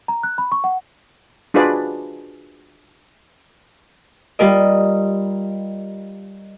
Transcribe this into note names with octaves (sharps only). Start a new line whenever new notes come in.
A#5
F#6
B5
C#6
F#5
D4 F4 F#4 G#4 B4 D5
G3 F4 A#4 D#5